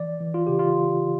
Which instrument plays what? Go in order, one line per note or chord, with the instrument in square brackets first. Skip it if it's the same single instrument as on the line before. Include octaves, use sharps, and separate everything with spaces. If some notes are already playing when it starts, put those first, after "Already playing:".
Already playing: [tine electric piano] E3 D5
E3
F4
C#3 G4
F4